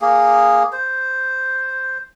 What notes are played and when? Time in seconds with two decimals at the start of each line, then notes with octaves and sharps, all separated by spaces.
0.01 A#3 G#4
0.73 C5